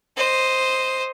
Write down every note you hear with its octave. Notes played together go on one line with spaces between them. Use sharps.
C5 D#5